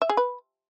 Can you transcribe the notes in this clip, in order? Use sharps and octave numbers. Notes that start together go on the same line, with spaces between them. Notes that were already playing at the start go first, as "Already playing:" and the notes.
E5
G#4
B4